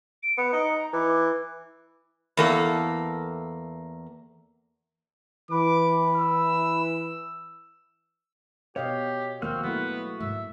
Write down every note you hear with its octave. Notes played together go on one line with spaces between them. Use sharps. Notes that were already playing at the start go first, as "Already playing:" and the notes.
D7
B3 C#7
D#4
A#5
E3 D6
E2 A#3 A4
E3 B4 D6
E6
B2 G4 C#5 D#5 F5
D#2 F3 A#3 C4 F#4 F6
F3 F#3 A3 B3 E4
G#2 E5